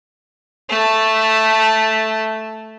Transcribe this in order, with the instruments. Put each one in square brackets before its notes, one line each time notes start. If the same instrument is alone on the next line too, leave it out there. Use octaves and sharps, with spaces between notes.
[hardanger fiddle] A3 A5